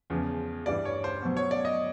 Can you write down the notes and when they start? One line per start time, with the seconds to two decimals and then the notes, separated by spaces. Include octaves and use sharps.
0.10 E2 C#3 F3
0.66 G2 E3 G3 D5
0.85 C#5
1.04 C5
1.22 B2 F#3
1.37 C#5
1.51 D5
1.65 D#5